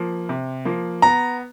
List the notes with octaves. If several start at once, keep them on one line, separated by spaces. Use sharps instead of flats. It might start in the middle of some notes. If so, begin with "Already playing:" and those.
Already playing: F3 A#3
C3
F3 A#3
B3 A#5